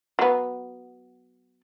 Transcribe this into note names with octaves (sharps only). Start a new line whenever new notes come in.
F#3 B3